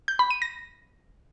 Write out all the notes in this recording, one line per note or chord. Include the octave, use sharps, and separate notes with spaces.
G6
B5
D#7
A#6